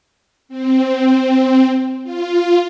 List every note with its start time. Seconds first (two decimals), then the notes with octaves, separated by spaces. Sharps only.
0.49 C4
2.04 F4